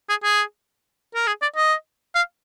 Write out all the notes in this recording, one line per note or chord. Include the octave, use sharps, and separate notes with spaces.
G#4
G#4
A#4
G#4
D5
D#5
F5